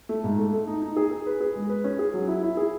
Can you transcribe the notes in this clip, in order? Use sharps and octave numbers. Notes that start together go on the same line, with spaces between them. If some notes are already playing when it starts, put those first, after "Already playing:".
A3
G#2
A3
A3
D#4
D#4
G#4
G#4
B4
G#4
G#3
B4
C#4
G#4
F#3
E4
E4
G#4